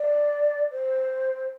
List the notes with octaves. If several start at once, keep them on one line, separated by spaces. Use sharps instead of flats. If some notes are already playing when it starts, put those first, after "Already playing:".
Already playing: D5
C5